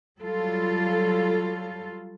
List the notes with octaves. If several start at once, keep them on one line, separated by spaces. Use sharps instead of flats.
F#3 G3 F4 A4